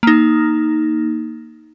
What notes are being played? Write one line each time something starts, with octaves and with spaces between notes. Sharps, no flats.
A#3 D#4